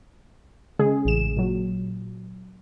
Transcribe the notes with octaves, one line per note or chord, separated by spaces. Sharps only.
C#3 G#3 G#4
A1 E7
A#2 F#3